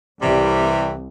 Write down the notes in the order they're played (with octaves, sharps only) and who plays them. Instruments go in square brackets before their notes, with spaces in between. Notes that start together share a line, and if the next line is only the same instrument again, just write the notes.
[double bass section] C2 [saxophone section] C3 E3 G3